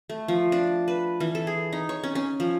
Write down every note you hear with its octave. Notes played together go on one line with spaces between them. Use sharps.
A3
F3
D4
B4
E3
A4
G#4
D#4
C#5
C#4
C#4
F3